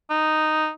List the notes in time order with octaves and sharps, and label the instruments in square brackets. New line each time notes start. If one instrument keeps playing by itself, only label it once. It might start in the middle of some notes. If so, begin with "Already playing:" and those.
[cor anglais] D#4